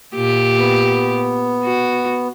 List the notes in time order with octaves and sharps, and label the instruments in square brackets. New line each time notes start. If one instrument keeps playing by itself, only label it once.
[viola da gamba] A#2 G4
[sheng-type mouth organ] B3
[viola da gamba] F#4